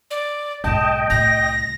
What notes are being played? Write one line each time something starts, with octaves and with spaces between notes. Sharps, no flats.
D5
B1 G#2 D#5 G5 A5
C2 A2 A#6